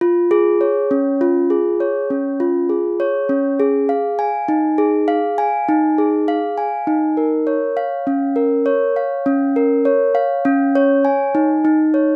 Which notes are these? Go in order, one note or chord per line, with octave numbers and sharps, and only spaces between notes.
F4
G#4
C#5
C#4
F4
G#4
C#5
C#4
F4
G#4
C#5
C#4
G#4
F5
G#5
D#4
G#4
F5
G#5
D#4
G#4
F5
G#5
D#4
A#4
C#5
F5
C#4
A#4
C#5
F5
C#4
A#4
C#5
F5
C#4
C#5
G#5
D#4
D#4
C#5